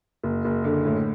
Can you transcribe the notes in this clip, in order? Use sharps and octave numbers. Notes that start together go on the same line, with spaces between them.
F#1
F#1
D3
A2